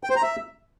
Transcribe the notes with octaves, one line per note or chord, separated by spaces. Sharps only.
G5
C5
A#5
E5